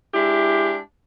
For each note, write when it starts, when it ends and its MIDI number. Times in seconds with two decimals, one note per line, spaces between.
0.14 0.77 56
0.14 0.77 62
0.14 0.77 64
0.14 0.77 67